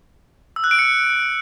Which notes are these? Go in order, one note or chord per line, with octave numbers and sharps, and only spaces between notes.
E6
F#6
D7
C#7